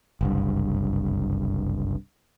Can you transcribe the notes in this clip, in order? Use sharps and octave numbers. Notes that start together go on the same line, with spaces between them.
F#1 C2 G2